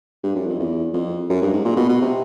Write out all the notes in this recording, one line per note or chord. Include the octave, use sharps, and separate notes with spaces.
G2
F#2
F2
E2
F2
F#2
G2
G#2
A#2
B2
B2
C3